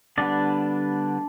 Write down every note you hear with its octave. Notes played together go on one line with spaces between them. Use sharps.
D3 G3 B3 D4 D5